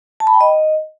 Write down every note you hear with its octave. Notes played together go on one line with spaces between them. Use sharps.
A5
B5
G5
D#5